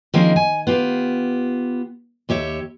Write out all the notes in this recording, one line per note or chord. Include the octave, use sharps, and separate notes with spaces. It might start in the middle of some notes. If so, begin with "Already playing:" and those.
D#3 F3 G#3 A#3 C4 C#4
G#5
B3 F4 G4
D#2 G4 C#5 E5